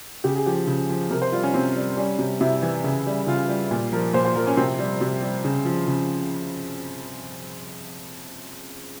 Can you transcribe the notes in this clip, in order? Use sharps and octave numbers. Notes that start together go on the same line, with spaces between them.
C#3 G4
G#4
F3 G4
C#3
F3
C3 A#4
C5
G3 F4
C#4
C3 C4
G3
G3 C#4
C3
C3 E4
E3
C#3
G3
C#3 F4
G3
A#2
F3 A#4
A#2 C5
C5
F3 A#4
C#4
C3 C4
G3
C3
G3
C#3
F3
C#3